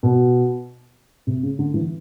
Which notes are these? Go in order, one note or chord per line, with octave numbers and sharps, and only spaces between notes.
B2
C3
C#3
D3
E3